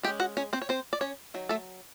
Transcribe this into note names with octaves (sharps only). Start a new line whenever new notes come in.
G#3 C#4 G4 G5
F#4 F#5
C#4 C#5
C4 C5
C#5
C4 C5
D5
C#4 C#5
D#3 F#3
A3 A4